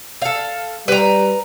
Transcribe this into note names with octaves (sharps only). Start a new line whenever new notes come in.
A4 F5
G3 B4 A#5